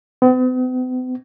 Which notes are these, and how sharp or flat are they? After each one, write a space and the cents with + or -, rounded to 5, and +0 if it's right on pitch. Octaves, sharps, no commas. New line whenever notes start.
B3 +45